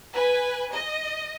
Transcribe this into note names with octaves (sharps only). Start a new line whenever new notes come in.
B4 G#5
D#5